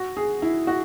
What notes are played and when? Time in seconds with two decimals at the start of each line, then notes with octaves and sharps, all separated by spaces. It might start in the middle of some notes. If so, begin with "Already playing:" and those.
Already playing: F#4
0.17 G#4
0.42 E4
0.67 F#4